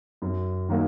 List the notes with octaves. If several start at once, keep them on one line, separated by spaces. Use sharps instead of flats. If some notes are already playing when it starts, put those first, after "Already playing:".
F#2
D#3 F#3 A#3